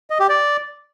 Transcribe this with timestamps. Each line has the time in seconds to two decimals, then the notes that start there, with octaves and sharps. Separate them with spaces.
0.10 D#5
0.20 G4
0.29 D5